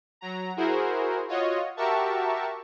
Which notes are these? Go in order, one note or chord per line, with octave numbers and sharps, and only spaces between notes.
F#3 A#5
E4 F#4 G#4 A#4 C5
F4 F#4 C#5 D#5
F#4 G4 A#4 E5 A5 C#6